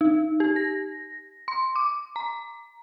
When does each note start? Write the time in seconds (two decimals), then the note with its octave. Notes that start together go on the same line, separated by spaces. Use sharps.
0.01 D#4
0.40 G4
0.56 A#6
1.48 C6
1.76 D6
2.16 A#5